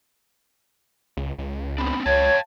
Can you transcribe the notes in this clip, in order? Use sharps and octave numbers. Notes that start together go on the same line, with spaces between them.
C#2
C#2
B3 C4 D4 B5
C#2 C#5 F5 G5 A5 G#6